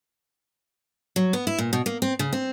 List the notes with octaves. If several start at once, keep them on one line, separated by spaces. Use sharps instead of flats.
F#3
B3
E4
A#2
B2
A#3
C4
C#3
C4